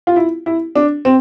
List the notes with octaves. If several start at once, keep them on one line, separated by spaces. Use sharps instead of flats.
F4
E4
E4
D4
C4